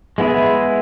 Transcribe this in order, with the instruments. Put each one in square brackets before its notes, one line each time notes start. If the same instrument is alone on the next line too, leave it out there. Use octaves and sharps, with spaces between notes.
[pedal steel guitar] G#3 B3 E4 G#4